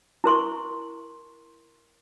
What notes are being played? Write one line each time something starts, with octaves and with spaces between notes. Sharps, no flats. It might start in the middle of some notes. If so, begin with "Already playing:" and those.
E4 A#4 C6 C#6